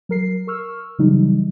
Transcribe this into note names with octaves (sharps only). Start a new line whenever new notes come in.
F#3 A#4 C7
A#4 C#6 E6 F6
C#3 E3 F#3 G3 D#4